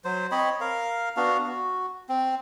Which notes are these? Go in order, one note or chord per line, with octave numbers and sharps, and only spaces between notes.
F#3 C5
C4 C#5 D#5 B5
A#4 F5
B3 D4 F#4 F5
F#4
C4